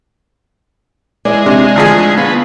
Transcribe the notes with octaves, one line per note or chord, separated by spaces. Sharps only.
G#3 E4 D5
C3 D4
D2 F3 G#4
B3 F4